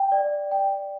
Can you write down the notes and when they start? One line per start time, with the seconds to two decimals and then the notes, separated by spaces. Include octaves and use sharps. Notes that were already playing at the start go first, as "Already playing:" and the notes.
Already playing: G5
0.12 D5
0.51 G5